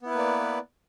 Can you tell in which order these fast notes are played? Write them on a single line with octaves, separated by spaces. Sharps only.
B3 E4 B4 A#3 D5